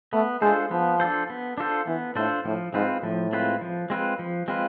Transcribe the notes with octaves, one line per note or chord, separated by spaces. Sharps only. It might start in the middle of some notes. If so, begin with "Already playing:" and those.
A3 B3
G#3 D4 F4 A4 C5
F3 B3
D4 F4 A4 C5
B3
D4 F4 A4 C5
E3 B3
A2 D4 F4 A4 C5
A2 F3
G#2 G#3 C4 F4 B4
A2 F3
G#3 C4 F4 B4
F3
G#3 C4 F4 B4
F3
G#3 C4 F4 B4